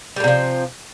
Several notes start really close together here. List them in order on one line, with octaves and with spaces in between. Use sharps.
G3 A2 C3 F3